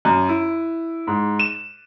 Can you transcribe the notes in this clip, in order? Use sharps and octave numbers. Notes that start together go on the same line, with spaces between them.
F#2
E4
G#2
E7